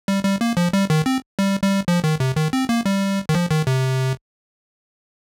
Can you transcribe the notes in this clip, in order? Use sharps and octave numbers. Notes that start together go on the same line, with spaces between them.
G3
G3
A#3
F3
G3
D#3
C4
G3
G3
F3
D#3
C3
D#3
C4
A#3
G3
D#3
F3
D#3
C3